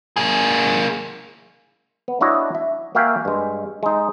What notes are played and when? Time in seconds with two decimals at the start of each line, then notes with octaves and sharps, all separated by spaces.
0.17 A#3 G#4
2.08 B3
2.21 D4 E4 F#4 C#5 D#5
2.55 E5
2.95 A#3 F#4 E5 F5 G5 G#5
3.25 G2 G#3
3.83 G#3 D#4